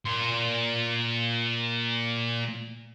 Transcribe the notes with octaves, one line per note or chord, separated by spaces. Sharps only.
A#2 C6